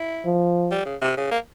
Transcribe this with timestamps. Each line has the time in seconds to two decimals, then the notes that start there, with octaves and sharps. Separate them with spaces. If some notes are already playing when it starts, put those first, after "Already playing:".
Already playing: E4
0.25 F3
0.71 G3
0.86 C#3
1.02 C3
1.17 C#3
1.31 A#3